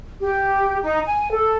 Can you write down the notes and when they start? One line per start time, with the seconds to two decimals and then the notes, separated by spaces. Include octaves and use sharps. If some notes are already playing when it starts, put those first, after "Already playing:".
0.21 G4
0.83 D#4
1.06 G#5
1.30 A4